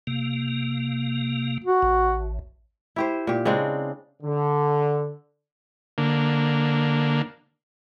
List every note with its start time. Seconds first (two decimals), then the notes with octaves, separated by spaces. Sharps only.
0.07 C3 A#3
1.64 F#4
1.82 A1
2.96 E4 G4 C5
3.27 A#2 G4
3.45 C#3 G#3 C4 D4
4.23 D3
5.98 D3 A#3